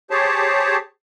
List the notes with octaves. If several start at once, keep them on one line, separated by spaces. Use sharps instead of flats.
G4 G#4 C5 C#5 A5